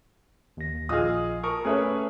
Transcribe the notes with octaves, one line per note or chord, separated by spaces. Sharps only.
D#2 A#6
A#1 F4 G#4 D#5 D#6 F6
A#4 A5 C#6 D#6
A3 C#4 G#4 B4 C#5 E5